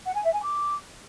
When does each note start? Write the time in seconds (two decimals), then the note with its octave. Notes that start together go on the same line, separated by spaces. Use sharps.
0.06 F#5
0.15 G#5
0.24 E5
0.33 G#5
0.42 D6